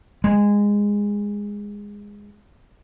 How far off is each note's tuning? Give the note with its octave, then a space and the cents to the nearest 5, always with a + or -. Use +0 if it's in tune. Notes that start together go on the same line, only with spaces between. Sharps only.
G#3 -15